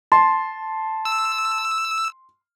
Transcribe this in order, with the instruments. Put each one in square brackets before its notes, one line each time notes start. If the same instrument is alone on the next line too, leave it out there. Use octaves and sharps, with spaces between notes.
[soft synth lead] A5 [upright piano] C6
[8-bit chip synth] E6